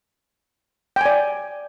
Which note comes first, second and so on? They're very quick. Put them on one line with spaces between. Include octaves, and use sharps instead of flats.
G5 G#5 D5